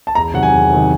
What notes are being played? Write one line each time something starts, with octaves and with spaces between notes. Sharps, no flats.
A5
E2 A#5
C3 D#3 F#3 F#5
G#5
E2
C3 D#3 F#3